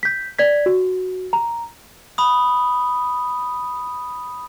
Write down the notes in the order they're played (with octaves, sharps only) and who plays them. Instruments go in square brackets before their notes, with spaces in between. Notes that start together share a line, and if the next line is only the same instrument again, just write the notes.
[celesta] G6 B6
D5 G#6 B6
F#4
A#5
[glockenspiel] B5 D#6